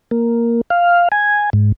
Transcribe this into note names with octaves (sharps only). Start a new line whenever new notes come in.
A#3
F5
G#5
G#2